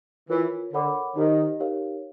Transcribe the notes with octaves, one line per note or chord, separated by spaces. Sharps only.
E3 F4 A#4 C#5
D3 A#4 C#5 F#5 B5 D6
D#3 D#4 G4 C5 D#5
D#4 G4 A#4 C#5 F5